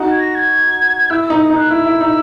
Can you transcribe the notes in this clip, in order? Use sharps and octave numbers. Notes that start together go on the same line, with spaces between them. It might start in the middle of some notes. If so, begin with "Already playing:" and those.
Already playing: D#4 F#4
G#6
A#6
G#6
E4 E6
D#4 E6
D#6
D#4
F#6
E4 E6
E4
D#4